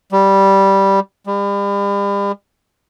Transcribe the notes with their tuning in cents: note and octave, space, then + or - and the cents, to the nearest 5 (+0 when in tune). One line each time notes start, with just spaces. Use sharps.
G3 -5
G3 +40